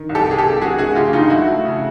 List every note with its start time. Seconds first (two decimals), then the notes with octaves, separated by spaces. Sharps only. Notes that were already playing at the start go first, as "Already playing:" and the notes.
Already playing: D#3
0.09 C2
0.15 G4 A4
0.27 C3 G#4
0.38 G4 A4
0.44 C2
0.61 F#3 F#4 G#4
0.78 A3 F#4 G#4
0.95 C#3 F4 G4
1.13 C#2 D#4 F4
1.30 F#3 E4 F#4
1.47 A3
1.65 C#3